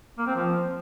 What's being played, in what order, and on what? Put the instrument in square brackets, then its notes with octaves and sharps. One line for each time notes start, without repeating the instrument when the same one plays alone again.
[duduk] A#3
C4
F3